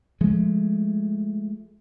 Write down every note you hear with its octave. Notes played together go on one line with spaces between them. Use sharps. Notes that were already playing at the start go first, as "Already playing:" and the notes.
F3 G#3 A3